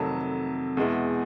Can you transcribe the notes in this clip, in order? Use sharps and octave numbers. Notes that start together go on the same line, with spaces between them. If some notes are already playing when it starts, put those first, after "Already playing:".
Already playing: F2 C3 D#3 F#3 A3 A5
E2 B2 G#3 B3 E4